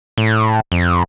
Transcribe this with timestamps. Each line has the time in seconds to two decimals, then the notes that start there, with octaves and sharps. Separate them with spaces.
0.18 A2
0.72 F2